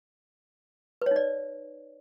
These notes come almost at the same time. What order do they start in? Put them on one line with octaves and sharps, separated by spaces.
B4 C#5 D#4 D5